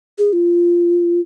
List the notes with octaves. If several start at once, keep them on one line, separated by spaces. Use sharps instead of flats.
G#4
F4